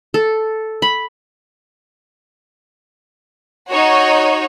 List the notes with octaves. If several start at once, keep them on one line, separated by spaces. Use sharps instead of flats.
A4
B5
D#4 F#4 C#5